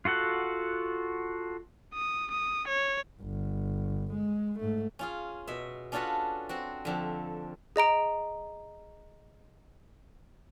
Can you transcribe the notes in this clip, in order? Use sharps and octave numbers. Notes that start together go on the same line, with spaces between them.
F4 F#4 A4 F#5
D#6
D#6
C#5
G1
G#3
G#2 A3
C#4 F4 G#4
B2 E5
C#4 D4 F4 F#4 A4 B4
C4 F#4
F2 D3 C4
G#4 D#5 A#5 D7